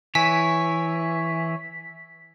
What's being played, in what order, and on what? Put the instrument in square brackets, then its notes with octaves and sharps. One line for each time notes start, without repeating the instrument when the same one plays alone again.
[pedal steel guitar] E3 [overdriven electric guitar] C#5 [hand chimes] G#5 [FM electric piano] B6